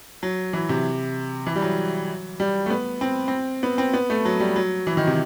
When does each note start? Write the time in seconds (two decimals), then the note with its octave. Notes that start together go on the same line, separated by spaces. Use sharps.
0.23 F#3
0.53 E3
0.69 C3
1.47 E3
1.55 G3
1.62 F#3
2.40 G3
2.66 A3
2.70 B3
3.01 C4
3.28 C4
3.63 B3
3.78 C4
3.94 B3
4.10 A3
4.25 F#3
4.40 G3
4.56 F#3
4.87 E3
4.97 D#3
5.07 C3